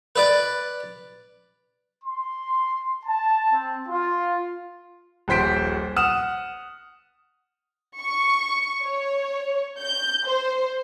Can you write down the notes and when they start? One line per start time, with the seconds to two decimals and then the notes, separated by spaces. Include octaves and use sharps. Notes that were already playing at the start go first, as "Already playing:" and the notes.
0.16 B4 D5
2.05 C6
3.05 A5
3.52 C4
3.88 F4
5.28 D#1 A#1 C5 B6 D7
5.96 F#5 D#6 F6 E7
8.00 C#6
8.83 C#5
9.80 G6
10.26 C5